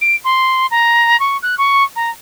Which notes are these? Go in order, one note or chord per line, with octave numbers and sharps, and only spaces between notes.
D7
C6
A#5
C#6
F#6
C#6
A#5